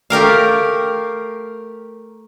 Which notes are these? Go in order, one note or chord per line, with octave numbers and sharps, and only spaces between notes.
A3 G4 A#4 F5